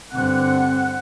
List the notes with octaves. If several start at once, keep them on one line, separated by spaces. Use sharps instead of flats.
G2 D3 C4 F#5 F#6